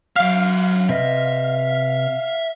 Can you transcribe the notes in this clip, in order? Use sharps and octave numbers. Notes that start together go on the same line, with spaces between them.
F#3 E5 F5
C3 B4 D#5 E5